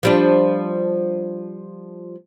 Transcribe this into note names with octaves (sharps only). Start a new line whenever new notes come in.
F3 G3 D4